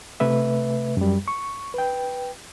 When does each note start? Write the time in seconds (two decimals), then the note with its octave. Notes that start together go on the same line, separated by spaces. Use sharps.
0.20 C3 A3 B4 E5
0.97 F#2 G3
1.28 C#6
1.74 B4 G5